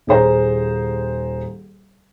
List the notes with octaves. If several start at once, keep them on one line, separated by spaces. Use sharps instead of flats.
D#1 G#4 C5 A#5